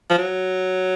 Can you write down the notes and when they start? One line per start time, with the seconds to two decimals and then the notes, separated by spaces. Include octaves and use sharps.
0.10 F3
0.18 F#3